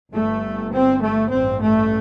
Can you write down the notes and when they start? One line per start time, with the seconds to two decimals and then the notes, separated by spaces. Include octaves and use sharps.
0.12 G1 G2 A3
0.72 C4
1.01 A3
1.31 A1 G2 C4
1.61 A3